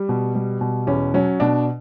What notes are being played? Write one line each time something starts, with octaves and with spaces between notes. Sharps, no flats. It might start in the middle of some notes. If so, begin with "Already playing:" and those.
Already playing: G3
B2
G3
B2
E2 C#4
F#3 C#4
B2 D4